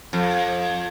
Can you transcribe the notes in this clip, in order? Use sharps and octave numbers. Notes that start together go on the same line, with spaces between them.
F2